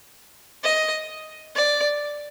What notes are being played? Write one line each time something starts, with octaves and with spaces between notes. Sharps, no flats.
D#5
D5